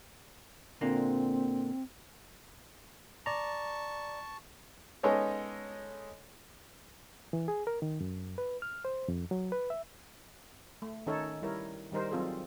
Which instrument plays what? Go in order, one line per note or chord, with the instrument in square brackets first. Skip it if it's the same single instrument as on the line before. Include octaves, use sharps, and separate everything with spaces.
[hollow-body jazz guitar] A#2 D3 A#3 [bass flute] C4
[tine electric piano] D5 A#5 [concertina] A5 C#6
[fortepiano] G#3 B3 C#4 D#4 A4 C#5
[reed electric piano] E3
G#4
A#4
D#3
F#2
B4
F6
C5
F2
F#3
B4
E5
[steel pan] A3
D#3 C#4 D#4 A4 C#5
G3 E4 A#4 C#5
D#3 G3 D#4 A#4 C5
F#3 C4 F4 G#4 A4